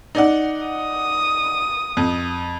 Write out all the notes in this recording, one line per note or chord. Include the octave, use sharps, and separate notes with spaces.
D#4 D5 F#5
D#6
F2